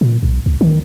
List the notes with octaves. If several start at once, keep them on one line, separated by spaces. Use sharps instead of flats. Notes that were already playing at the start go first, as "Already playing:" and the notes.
A#2
B1
C#2
D#3